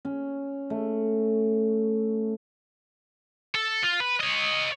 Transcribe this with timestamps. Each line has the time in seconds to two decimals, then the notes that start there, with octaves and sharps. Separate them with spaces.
0.05 C#4
0.70 A3
3.55 A4
3.83 F4
4.00 B4
4.21 C#5 D#5